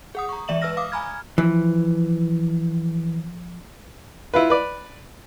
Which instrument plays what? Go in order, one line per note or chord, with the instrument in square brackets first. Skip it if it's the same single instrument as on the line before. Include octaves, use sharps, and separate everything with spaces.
[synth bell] G#4 F#5 D#6
A#5 C#6
E3 G#3 D5 E5 E7 F#7
B4 E5 E6 F6 A#6
F5 D6 D#6
G#5 A#5 B5 F6 G#6
[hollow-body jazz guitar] E3 [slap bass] F3
[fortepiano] E4 F4 B4
B4 D5